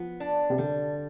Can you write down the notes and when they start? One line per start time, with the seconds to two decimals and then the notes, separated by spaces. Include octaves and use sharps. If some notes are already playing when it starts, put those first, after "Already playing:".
Already playing: F3 B3
0.20 D4
0.50 C3
0.58 D3 G3